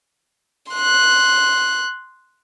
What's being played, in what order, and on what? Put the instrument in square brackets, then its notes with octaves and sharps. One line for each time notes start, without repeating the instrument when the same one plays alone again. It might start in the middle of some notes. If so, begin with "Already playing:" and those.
[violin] C6 F#6